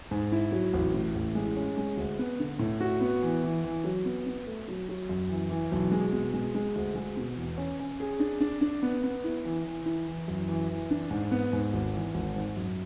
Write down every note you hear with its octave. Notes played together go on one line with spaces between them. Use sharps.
G#2
E4
F#3
A1
A2
A1
G#3
C#4
G#3
D2
B3
D3
A2
F#4
B3
E3
E3
E3
F#3
B3
B3
A3
F#3
F#3
F#2
E3
E3
B1
G#3
B2
G#3
G#3
D2
G#3
B2
E2
C#4
C#4
G#4
D4
D4
D4
B3
B3
E4
E3
E3
E4
E3
F#2
E3
E3
D4
G#2
B3
G#2
G#1
E3
G#1
G#2
F#2